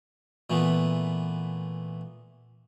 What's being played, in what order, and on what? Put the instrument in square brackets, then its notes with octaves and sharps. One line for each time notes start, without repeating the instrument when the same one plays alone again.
[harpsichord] A#2 E3 A3 B3